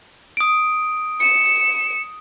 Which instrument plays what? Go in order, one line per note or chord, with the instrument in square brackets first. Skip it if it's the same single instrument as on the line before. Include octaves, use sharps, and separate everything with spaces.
[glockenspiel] D#6 D7
[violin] C#7 E7